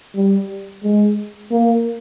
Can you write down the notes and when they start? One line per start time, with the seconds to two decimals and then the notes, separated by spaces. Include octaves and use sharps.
0.16 G3
0.83 G#3
1.51 A#3